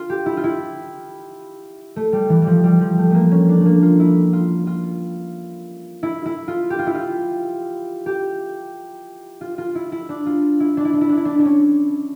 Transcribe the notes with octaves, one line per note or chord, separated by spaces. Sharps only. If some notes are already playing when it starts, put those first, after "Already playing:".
Already playing: F4
G4
E4
F4
E4
A3
G3
E3
F3 G3
G3
F3
A3
A3 A#3
C#4
D4
A3 A#3
F4
E4
F4
F4
E4
E4
F4
G4
F4
E4
F4
G4
F4
F4
E4
E4
D4
F4
E4
D4
E4
D4
E4
D4
E4
D4
D4
C#4